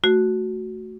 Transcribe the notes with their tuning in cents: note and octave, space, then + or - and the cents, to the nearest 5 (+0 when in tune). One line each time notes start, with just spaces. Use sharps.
A3 +0 F#4 +0